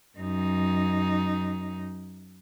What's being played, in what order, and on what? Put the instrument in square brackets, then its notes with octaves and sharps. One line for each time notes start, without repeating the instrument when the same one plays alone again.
[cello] F#2 D#4